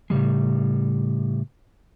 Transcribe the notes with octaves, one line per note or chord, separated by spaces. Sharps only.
A2 C#3 G3 G#3